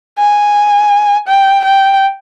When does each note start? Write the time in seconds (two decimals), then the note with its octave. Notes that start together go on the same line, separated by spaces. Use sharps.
0.19 G#5
1.28 G5
1.65 G5